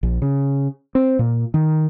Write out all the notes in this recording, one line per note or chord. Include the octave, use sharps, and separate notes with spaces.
A#1
C#3
C4
A#2
D#3